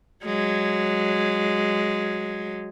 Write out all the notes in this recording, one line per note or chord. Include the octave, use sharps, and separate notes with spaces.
F#3 G#3